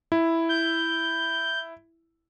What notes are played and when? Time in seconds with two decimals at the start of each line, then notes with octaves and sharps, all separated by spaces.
0.12 E4
0.49 G6